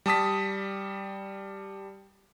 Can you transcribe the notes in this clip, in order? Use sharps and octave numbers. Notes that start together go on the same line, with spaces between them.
G3 A5 D#6 B6